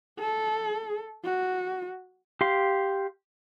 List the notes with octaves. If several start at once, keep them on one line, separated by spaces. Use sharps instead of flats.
A4
F#4
G4 F5 C6